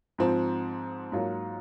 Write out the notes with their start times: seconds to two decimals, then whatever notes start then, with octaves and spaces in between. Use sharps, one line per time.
0.18 G#2 F3 C4
1.12 G#2 F#3 A#3 F4